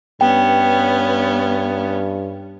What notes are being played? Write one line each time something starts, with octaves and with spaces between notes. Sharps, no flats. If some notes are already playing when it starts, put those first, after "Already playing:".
G2 B3 C#4 G5